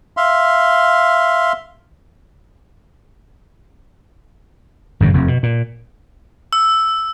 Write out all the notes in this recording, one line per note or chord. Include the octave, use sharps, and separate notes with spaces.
E5 F5 C6
G#1 F#2 C#3
F1 F2
B2
A#2
E6